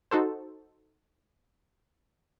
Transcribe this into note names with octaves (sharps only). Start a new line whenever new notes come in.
D#4 F#4 A4 C5